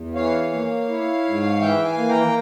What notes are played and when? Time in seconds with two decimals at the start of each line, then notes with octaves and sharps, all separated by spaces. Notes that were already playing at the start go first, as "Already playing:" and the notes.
Already playing: E2
0.15 E3 C#5 F5
0.52 A#3
0.89 E4
1.24 G#2
1.61 E3 E5 G5
1.85 F5 G#5
1.97 A#3
2.09 G5 A#5